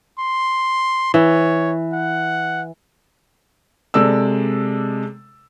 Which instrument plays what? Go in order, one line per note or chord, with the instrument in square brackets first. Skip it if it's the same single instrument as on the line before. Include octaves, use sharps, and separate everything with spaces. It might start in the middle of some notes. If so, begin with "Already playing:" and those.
[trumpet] C6
[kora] E3 [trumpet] C#5
[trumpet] F#5
[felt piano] C3 G#3 A4 D5 E6